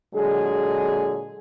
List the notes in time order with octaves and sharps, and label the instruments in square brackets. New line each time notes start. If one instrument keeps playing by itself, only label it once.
[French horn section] A#2 D3 F#3 G#3 G#4